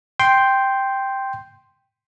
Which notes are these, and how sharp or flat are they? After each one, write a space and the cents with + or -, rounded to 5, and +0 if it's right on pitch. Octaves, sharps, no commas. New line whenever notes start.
G5 +0 C6 +0